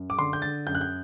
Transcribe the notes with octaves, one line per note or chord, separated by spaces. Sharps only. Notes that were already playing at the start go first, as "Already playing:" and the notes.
Already playing: F#2
D6
D3 C6
G6
D3 A6
F#2 G6
F#6
G6